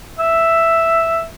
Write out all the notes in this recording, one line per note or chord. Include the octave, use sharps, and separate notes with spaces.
E5